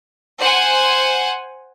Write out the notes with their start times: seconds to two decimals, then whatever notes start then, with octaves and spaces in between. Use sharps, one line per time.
0.40 C5 F#5 G#5